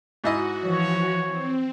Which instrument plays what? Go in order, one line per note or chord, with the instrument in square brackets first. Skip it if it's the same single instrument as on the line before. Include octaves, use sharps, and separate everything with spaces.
[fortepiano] G#2 E4 D#5 [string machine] F#4
[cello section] E3 F3 [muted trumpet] C#5
[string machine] C4